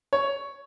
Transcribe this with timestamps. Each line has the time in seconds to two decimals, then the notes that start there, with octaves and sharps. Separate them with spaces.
0.13 C#5